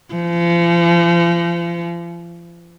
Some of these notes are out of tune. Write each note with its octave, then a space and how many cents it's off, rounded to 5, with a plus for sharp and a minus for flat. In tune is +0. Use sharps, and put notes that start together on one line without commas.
F3 -40